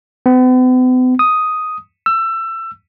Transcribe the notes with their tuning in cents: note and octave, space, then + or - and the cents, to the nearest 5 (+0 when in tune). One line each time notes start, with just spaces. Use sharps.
B3 +45
D#6 +5
E6 +25